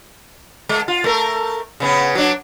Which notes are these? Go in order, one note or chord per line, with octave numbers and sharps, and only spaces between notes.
G#3
F4
A3 A#4
C#3 B3 C#4
F#3 D4